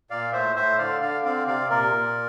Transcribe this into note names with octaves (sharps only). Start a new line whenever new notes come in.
A#2 D5 F5
A2 C5 E5
A2 C5 E5
D3 D5 F5
D3 D5 F5
C4 D5 F5
C3 D5 F5
A#2 A#4 D5
A#2